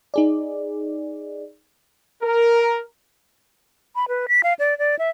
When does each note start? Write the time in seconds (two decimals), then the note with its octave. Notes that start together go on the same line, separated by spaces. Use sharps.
0.14 D#4 G#4 D5
2.23 A#4
3.96 B5
4.08 B4
4.28 B6
4.43 F5
4.59 D5
4.79 D5
4.99 E5